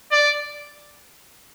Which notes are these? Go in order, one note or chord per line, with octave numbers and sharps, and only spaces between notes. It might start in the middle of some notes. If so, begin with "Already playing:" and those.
D5